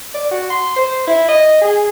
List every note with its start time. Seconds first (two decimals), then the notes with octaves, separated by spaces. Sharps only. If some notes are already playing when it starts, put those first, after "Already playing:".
0.14 D5
0.31 F#4
0.50 C6
0.76 C5
1.07 E4
1.28 D#5
1.61 G#4